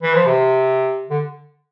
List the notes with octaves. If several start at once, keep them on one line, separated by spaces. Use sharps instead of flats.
E3
F3
C3
D3